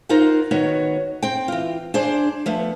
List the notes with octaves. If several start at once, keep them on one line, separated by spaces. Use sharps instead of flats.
D#4 F4 A#4 C5 F#5
D#3 B3 F#4 C#5
C4 G5
E3 F4
D4 G#4 C5 D5
F3 A3 B3